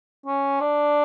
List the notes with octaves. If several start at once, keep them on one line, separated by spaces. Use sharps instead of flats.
C#4
D4